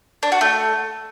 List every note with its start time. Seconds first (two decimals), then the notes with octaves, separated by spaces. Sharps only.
0.23 D4
0.32 F#4
0.41 A3